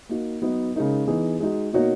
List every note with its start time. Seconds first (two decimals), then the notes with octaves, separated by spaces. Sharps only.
0.09 A#3 D#4 F#4
0.42 F#3 B3 D#4
0.75 C#3 G#3 D#4 A#4
1.07 E3 B3 D#4 G#4
1.40 G#3 D#4 F#4
1.73 B2 A#3 D#4 F#4 C#5